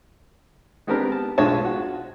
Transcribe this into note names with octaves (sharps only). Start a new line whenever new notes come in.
G#3 B3 C4 D4 G4 A#4
A5
B1 G#3 D4 F4 C#5 A5
F4 F#4